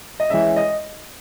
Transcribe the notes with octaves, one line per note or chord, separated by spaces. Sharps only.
D#5
E3 G#3 C#4 E5
D#5